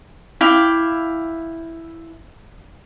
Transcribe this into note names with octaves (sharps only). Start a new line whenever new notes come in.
E4 F5 G5 D6